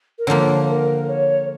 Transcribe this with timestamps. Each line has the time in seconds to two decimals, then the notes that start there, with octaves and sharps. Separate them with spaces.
0.18 A#4
0.27 D3 F3 A#3 C#5
0.68 A#4
1.08 C#5